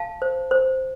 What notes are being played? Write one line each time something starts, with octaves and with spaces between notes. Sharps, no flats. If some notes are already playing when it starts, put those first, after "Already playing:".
Already playing: F5 A5
C5
C5